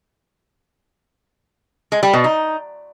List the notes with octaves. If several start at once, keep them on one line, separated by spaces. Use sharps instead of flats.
G#3
G3
B2
D#4